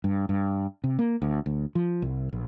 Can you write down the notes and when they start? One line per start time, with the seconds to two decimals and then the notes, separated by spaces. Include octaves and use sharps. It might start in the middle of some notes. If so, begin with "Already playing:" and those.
0.04 G2
0.29 G2
0.84 C3
0.99 A#3
1.22 D2
1.46 D2
1.75 F3
2.02 C2
2.33 A#1